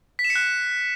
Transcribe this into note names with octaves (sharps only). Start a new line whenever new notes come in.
B6
E7
C#7
F#6